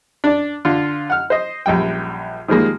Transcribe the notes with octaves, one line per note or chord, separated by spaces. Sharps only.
D4 D5
D3 F4
F#5 F6
C5 D#5
A#1 F#2 G3 G5
D#3 F3 G3 G#3 A#3